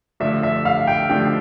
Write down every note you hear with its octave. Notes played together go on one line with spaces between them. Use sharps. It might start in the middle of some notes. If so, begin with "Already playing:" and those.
D3 F3 A3 D4 E5
E5
F5
G5
D3 F3 A3 D4 G5